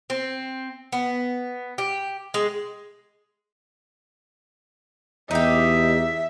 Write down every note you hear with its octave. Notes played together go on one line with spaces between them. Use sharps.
C4
B3
G4
G#3
E2 D#4 G4 E5